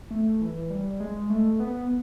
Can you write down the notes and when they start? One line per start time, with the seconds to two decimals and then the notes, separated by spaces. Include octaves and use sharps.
0.11 A3
0.41 E3
0.70 G3
1.00 G#3
1.30 A3
1.60 B3